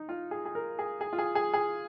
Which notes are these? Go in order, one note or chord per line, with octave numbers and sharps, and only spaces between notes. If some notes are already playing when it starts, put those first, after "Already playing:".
Already playing: D#4
F4
G#4
G#4
A#4
G#4
G#4
F4
G#4
G#4
G#4